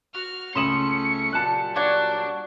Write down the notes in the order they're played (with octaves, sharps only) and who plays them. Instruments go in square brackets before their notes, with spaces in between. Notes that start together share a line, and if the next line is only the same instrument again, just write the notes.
[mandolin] F#4 [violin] F6
[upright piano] C#2 E7 F#7 [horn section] A3 C#4 [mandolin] C6 D#6 [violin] C#7
[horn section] A#2 F#3 G3 [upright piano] A5 F#6
[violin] D4 [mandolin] F#4 C#5 D5